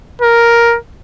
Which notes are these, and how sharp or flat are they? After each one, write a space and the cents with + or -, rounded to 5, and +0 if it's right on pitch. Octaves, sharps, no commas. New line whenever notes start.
A#4 +5